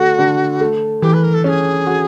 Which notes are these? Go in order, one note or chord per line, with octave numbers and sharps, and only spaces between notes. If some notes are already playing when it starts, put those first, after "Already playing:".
Already playing: D3 A3 F#4
D3
A3
E3 G4
B4
A#4
A4
C#4 G#4 A4
F#4